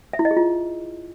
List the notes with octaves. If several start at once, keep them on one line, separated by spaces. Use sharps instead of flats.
E5
E4
D#5
G#4
F4